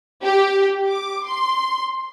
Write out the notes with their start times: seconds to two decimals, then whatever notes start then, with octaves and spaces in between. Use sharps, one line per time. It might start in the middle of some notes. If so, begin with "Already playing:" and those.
0.23 G4
0.89 D6
1.26 C6